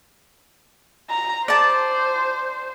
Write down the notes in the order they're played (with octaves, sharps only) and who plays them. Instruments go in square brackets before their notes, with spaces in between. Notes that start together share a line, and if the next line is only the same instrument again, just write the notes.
[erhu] A#5
[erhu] C5 [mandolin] D5 A5